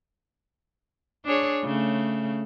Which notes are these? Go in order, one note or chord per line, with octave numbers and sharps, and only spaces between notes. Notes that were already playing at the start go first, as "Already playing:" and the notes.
D4 G#4 C#5
C#3 A3